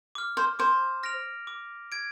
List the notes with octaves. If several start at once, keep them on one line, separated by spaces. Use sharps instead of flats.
D6 F6
C5
C5 D6
F6 A#6 D7 F7
D6
G#6 D7